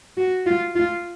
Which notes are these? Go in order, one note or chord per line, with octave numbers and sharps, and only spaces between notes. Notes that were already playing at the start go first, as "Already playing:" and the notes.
F#4
F4
F4